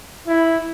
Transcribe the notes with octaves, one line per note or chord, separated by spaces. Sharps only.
E4